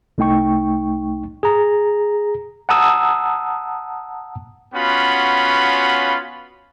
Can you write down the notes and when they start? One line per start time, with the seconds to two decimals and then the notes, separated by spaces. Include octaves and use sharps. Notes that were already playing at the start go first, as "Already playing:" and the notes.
0.18 C2 A3 D#4 G5 C#6
1.43 G#4 A#5
2.69 F#5 A5 A#5 D#6 E6
4.74 B3 C#4 F4 F#4 F#5 B5